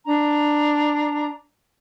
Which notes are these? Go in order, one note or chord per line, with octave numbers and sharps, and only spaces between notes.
D4 A#5